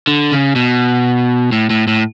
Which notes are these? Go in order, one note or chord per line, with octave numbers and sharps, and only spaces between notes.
D3
C#3
B2
A2
A2
A2